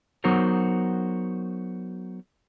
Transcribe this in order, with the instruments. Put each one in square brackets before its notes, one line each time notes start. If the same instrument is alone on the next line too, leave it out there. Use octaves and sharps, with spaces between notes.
[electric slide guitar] F#3 B3 D#4 F#4 A#4 C5